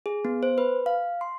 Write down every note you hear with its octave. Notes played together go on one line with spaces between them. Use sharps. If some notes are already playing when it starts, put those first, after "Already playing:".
G#4
B3
C5
B4
F5
C6